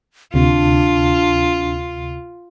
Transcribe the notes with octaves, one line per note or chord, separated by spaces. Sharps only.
D2 C3 D4 F4